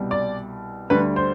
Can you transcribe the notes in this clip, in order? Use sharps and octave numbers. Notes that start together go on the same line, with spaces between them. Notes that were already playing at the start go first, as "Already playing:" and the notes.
Already playing: C2 B2 G3
D5
D2 D3 G3 B4
C5